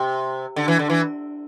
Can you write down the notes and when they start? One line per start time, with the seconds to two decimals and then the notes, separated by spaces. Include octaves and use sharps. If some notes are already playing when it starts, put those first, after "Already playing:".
Already playing: C3
0.56 D3
0.68 E3
0.79 D3
0.90 E3